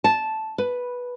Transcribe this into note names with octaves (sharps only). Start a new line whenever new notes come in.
A5
B4